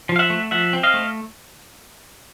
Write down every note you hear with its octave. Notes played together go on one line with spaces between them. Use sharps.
F3
F5
E5 F#5
A3
F3 E5 F#5
C4
D#5 F5
A3